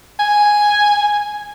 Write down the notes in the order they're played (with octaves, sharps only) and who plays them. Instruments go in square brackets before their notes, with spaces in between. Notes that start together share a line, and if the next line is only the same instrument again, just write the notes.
[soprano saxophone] G#5